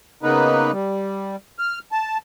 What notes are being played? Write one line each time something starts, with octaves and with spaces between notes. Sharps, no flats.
C#3 A#3 B3 D#4 B4
G3
F6
A5